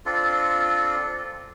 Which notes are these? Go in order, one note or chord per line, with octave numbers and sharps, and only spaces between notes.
C4 D4 F4 A4